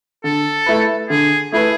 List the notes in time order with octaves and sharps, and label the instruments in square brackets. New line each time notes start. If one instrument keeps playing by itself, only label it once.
[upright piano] D3 [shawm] A4
[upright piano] A3 E4 B4
[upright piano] D3 [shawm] G#4
[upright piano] A3 E4 B4 [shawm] G#4